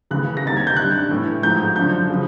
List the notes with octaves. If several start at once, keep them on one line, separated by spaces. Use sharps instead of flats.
D#2 C#3 E3 A3 F#6
A#6
D2 C3 D#3 G3 A#3 A6
G#6
G6
G2 D3 G3 F#6
A2 E3 A3
G#2 F3 A3 G6
F#2 D3 F3 G6
C#3 F3